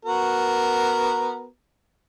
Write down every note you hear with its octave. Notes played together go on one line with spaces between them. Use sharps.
B3 F#4 A#4